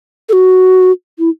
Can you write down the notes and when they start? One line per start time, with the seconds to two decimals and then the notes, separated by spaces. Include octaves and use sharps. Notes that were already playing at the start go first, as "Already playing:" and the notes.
0.29 A4
0.33 F#4
1.19 E4